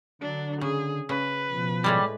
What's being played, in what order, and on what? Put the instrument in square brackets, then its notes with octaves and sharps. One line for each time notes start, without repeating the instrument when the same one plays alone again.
[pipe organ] D3 [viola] F#3 D4
[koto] C#3 [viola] G#4
[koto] C#3 [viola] B4
[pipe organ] B2 F3
[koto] A2 G#3 D5 [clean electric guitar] G3